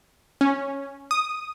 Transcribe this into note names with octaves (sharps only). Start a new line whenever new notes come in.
C#4
D#6